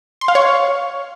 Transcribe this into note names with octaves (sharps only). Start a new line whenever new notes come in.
C6
F5
C#5
F5